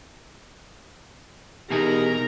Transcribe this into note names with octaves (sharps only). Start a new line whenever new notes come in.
B2 E3 D#4 G4 G#4 A#4 A#5